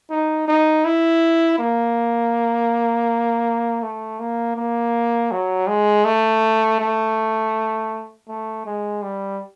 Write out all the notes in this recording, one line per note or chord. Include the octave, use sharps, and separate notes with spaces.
D#4
D#4
E4
A#3
A3
A#3
A#3
F#3
G#3
A3
A3
A3
G#3
G3